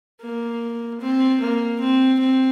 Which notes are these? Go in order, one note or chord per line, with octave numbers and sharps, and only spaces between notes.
A#3
C4
A#3
C4
C4